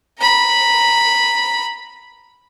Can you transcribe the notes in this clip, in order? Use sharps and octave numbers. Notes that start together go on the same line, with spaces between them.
A#5 B5